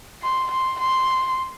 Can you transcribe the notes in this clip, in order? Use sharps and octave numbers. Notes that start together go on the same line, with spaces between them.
C6
C6
C6